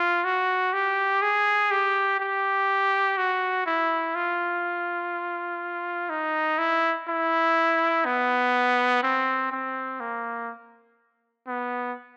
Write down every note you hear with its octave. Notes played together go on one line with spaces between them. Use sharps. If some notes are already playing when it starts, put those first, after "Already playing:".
Already playing: F4
F#4
G4
G#4
G4
G4
F#4
E4
F4
D#4
E4
E4
B3
C4
C4
A#3
B3